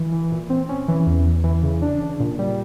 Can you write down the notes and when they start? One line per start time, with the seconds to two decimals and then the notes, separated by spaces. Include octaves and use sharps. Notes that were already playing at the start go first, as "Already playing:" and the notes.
Already playing: E3
0.12 E3
0.32 A#2
0.50 C4
0.69 C#4
0.88 E3
1.07 E2
1.26 E2
1.44 E3
1.63 C#3
1.82 D4
2.01 C#3
2.20 A#2
2.39 G3